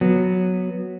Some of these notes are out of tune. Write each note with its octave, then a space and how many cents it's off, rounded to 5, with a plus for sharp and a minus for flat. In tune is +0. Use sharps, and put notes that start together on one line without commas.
F#3 -5 B3 +0